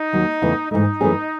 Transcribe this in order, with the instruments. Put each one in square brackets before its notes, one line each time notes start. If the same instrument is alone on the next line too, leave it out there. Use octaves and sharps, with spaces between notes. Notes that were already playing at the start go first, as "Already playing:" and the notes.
Already playing: [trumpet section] D#4
[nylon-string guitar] D#2 D#3 F#3
E2 C#3 E3 A3 E4
[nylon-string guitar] G#2 E3 A3 [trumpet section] D#4
[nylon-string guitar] F#2 E3 A3 C#4 G#4